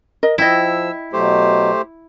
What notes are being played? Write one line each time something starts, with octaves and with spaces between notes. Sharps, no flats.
A#4 D#5
F3 E4 D#5 G5 E6
B2 F#3 A3 G4 C5